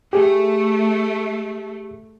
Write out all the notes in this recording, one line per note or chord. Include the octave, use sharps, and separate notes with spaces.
A3 G4 G#4